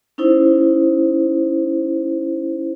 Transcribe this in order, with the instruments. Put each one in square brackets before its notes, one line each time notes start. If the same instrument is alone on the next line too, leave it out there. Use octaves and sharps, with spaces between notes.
[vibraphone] C#4 D#4 E4 C5